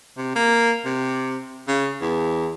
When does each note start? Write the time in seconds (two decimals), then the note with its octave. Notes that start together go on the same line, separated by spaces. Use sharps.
0.17 C3
0.36 A#3
0.85 C3
1.68 C#3
2.02 E2